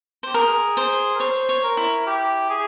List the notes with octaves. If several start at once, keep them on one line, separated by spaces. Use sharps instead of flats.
G4 C5
G#4 A#4
C5
A#4
C5 C#5
C#5
A#4
E4
G4
G#4